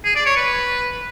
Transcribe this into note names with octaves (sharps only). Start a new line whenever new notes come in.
G#4
D5
C#5
B4